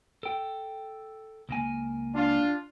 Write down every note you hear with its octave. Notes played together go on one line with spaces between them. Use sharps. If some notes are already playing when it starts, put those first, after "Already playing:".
A4 G5
C#2 A#3 G#5
D4 F4